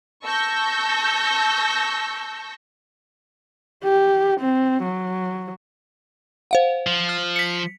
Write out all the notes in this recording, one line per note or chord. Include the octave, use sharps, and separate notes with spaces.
A5 C#6 E6 G6 A#6
G4
C4
F#3
C5 F5 F#5
F3
F6
B6 C#7